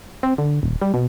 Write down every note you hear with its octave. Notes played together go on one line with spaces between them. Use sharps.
C4
D3
D#1
G3
B2